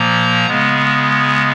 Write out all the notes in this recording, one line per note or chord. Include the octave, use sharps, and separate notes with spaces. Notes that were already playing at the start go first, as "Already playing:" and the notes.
Already playing: A#2 F3 A#3 A#5
C#3 G#3 B3